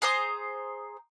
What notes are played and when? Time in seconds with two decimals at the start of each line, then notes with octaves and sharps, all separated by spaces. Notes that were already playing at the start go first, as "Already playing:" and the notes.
0.02 G#4 C5 A#5 D#6